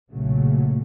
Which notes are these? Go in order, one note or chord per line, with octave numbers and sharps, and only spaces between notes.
F#1 B1 A#2 C#3 F#3 A3